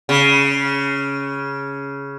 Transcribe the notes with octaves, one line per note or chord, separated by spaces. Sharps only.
C#3